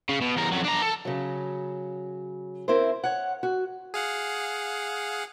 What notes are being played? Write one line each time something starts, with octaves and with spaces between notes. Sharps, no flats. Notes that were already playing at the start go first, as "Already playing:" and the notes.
C#3
B2
E2 A#4
F2 F#3
D4 A#5
A4
C#3 F#3
C4 E4 A#4 C5
C#5 F#5
F#4
G#4 F5 F#5